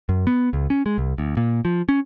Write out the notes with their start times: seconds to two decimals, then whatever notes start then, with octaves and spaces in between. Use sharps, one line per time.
0.09 F#2
0.27 B3
0.53 C#2
0.70 C#4
0.86 G#3
0.98 C2
1.18 D2
1.37 A#2
1.65 F3
1.89 C#4